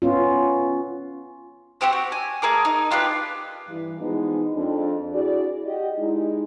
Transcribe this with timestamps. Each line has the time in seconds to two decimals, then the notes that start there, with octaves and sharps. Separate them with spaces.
0.02 B3 C#4 F4
1.81 C4 F#4 G4 C5
1.93 F#4
2.12 G#5
2.42 A3 G#4 A#4 D6
2.65 D#4
2.91 D4 F4 G4 B4
3.68 G2 E3
4.00 E3 F3 G#3 B3 D#4
4.55 F2 D4
5.13 E4 F#4 G#4 D5
5.65 F#4 G4 D#5
5.97 G#3 D#4 E4